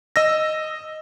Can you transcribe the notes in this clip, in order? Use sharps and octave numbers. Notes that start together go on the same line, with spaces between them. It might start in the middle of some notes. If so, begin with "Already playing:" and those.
D#5 E6 A#6